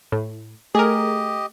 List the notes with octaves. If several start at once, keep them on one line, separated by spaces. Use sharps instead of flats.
A2
A3 G4 G#4 A#4 D#5